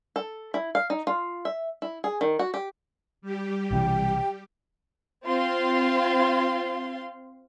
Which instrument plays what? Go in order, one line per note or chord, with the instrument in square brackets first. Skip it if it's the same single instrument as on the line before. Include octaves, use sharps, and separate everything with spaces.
[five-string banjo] A4
E4
F5
D#4
F4
E5
E4
G#4
D#3
F#4
G4
[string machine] G3 G4
[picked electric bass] B1 C3 E3 [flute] G5
[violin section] C4 F4 F5 C6